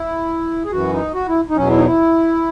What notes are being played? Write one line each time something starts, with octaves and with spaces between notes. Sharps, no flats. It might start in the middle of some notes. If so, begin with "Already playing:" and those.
Already playing: E4
G#4
F#2 E3 F#4
D#4
F#4
E4
D#4
E2 B2 F#3 C#4
E4
D#4
E4